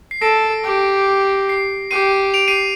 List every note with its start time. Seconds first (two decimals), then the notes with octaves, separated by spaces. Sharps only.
0.11 C7
0.21 A4 A#6 D7
0.64 G4
1.49 C7
1.91 G4 C7 D#7
2.34 D7 F7
2.48 C7 D#7